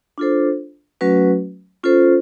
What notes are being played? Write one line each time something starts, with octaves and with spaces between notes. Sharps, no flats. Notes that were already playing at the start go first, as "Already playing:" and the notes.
D4 F4 A4 C5
F#3 A3 C#4 F#4 B4
C#4 F4 A4 C5